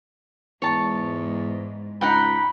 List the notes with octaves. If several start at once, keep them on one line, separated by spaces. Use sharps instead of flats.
E2 G#2 C#5 A5
C#2 D#4 F#5 G5 B5